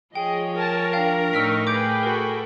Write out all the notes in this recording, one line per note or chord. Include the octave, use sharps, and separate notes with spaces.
F3 G#4 C#5 D#5 G5
A#4 G#5 A5
D4 F5 G5 A#5
A2 D#4 D#5 C#6 E6 F6 B6
G#4 B4 G5 D6 G6 D7
F#4 A4 A#4